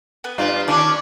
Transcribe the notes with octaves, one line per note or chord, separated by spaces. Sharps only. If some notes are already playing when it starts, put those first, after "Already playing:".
B3 B4
G2 F4 D5
D#2 C#4 D4 D5